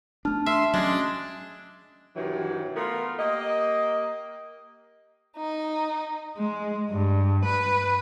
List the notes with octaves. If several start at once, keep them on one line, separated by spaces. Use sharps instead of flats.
A3 D4 A5 F6
E5 C6
F#3 G#3 C#4 D4
G2 C3 D#3 E3 F#3
A3 B3 F4 A#4
A#3 G4 D#5
D#4
G#3
G2
B4